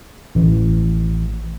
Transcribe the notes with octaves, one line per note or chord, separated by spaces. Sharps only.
A1